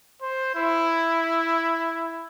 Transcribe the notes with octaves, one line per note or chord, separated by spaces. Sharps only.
C5
E4